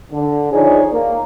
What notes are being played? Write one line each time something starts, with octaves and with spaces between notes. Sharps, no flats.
D3
F3 D#4 G#4 C#5 D5
A#3